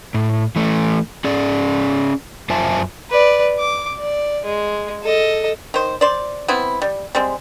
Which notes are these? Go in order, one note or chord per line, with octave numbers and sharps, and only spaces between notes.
A2
E3 A3
C#4 G#4 D5
F#2 F4 C5 E5 G#5 A5
B4 D5
D6
D5
G#3
A4 D#5
D#3 C5
C5 D5
B3 C4 E4
G3
G3 G#3 C4